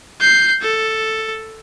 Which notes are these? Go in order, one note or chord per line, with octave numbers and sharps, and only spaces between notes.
G6 C7
A4